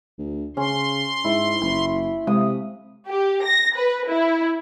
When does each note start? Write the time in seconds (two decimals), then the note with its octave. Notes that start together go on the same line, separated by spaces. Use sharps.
0.18 D2
0.57 C#3 C#4 C6
1.24 G#2 E4
1.62 F#1 B5
2.27 C3 G#3 D#6
3.08 G4
3.44 A#6
3.76 B4
4.08 E4